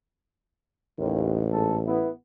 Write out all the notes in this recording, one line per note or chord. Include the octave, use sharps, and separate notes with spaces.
A1 D#2
G#2 A4
B3 E4